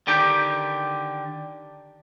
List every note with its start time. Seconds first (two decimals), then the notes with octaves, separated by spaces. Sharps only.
0.07 D3 D#3 G4 G5